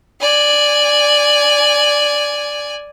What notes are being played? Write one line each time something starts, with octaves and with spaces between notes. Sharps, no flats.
D5 G#5